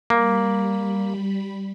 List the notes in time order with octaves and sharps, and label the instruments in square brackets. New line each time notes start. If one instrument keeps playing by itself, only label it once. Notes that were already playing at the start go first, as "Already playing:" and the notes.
[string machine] G3 B5 [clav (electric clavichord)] A#3